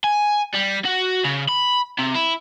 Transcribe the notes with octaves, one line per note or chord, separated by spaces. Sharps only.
G#5
G3
F#4
C#3
B5
C3
E4